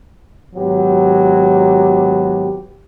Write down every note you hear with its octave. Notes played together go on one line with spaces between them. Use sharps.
G#1 F#3 B3 G4